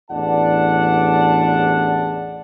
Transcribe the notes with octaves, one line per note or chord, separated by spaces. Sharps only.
A1 E2 D4 D5 F#5 A5